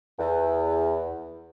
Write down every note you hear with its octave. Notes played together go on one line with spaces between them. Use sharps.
E2